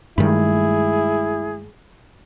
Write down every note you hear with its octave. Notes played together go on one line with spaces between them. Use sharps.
G2 D#3 G#3 A3 E4 G#4 B5